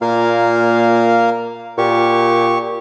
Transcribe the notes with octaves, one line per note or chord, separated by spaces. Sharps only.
A#2 A#3 A#4 F5
A#2 G4 C#6